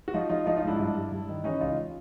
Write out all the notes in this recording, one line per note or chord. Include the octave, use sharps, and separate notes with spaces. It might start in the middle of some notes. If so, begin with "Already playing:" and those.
F#4
F3 D#4 F4
F3 D#4 F4
F3 D#4 F4
D#4 F4
G#2 D4 E4
G2
G2
G2
D#3
E3 C#4 D#4
C#2 D#4 F4